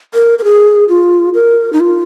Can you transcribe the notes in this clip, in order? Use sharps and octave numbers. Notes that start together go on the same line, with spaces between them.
A#4
A#4
G#4
F4
A#4
D#4
F4